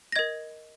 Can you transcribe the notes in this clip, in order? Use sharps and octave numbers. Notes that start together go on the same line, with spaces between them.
A#6
A#4 D#5 G#6